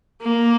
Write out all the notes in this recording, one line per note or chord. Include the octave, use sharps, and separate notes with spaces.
A#3